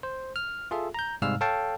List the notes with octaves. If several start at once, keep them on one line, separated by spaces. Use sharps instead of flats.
C5
F6
F4 G#4 A4 E5
A#5 G6
G#2 C3 G3 F5 E6 F6
A4 C#5 F5 G5 A5